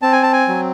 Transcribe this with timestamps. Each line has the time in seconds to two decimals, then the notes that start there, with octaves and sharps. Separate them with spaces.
0.02 C4 A5
0.12 G#5
0.23 A5
0.33 G#5
0.48 F#3